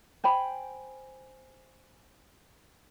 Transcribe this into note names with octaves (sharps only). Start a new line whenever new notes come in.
C5 G5 G#5 B5